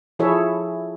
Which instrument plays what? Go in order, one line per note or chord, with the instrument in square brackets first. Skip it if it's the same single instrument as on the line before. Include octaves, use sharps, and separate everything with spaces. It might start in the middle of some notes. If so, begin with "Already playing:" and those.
[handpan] F3 E4 G#4 A4 C#5 E5